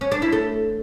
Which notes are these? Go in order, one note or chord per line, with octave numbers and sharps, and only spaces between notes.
C#4
D4
E4
A3